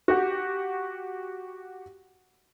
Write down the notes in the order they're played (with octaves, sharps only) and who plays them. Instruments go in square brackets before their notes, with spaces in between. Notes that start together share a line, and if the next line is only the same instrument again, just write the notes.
[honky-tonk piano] F#4 G4